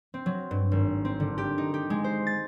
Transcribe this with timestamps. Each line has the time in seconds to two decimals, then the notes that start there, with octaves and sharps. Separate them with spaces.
0.14 C4
0.26 F#3
0.51 G2
0.72 G#1
1.05 C4
1.20 D3
1.38 G4
1.58 D#4
1.74 G4
1.90 G#3
2.04 C5
2.27 A6